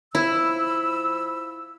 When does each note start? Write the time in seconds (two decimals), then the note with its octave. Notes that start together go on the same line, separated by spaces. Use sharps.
0.15 F3 E4 B5 E6